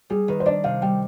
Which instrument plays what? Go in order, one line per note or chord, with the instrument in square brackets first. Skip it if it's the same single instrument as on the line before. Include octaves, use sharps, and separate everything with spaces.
[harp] G3 [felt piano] G#4
[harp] D#3 [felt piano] B4
[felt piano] C5
[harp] D4 [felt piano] D5
[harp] C3 [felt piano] F5
[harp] G3 [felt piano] G5